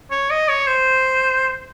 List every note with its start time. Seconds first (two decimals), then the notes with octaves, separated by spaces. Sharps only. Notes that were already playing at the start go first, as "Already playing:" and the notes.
0.11 C#5
0.30 D#5
0.48 C#5
0.67 C5